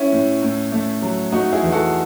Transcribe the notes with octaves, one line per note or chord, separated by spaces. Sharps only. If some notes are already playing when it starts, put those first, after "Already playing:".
Already playing: C#4 E4
A2
A2
A3
F#3
A3 D#4 F#4
E4 G#4
E2
F#4 A4